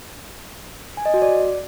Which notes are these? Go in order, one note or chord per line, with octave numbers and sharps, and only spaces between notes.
G#5
D#5
F#4
D5